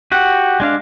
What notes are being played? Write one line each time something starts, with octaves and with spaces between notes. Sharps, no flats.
F#4 G4 F#5
G#3 D4 F5